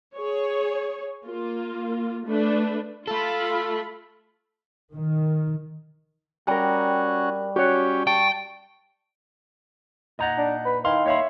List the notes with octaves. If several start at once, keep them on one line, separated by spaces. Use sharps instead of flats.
G#4 C#5
A#3 F4
A3 D4 B4
A3 F4 A4 B5
D#3
G3 C#4 F#4 A#4 G5 A#5
C#4 F#4 G4 C#5
G5 A5 C#6
A#2 D#4 D#5 F#5 A#5
D4
B4
D#3 E4 F5 C6
A#3 C#5 E5 F5 B5 C6